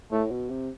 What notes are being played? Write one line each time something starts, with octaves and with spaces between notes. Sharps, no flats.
A2 A3
B2
C3